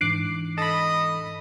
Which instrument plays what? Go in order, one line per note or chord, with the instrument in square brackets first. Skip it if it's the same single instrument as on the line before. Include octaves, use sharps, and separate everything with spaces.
[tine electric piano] G#2 E3 D4 [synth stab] D6 F#6 C7
[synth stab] A4 B5 [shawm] D#5